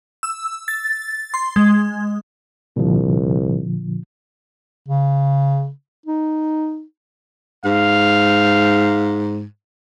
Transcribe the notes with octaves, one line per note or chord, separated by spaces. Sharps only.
E6
A6
C6
G#3
C2 A#2 D3 F3
C#3
D#4
G#2 F5